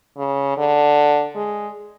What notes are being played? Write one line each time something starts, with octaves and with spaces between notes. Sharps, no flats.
C#3
D3
G#3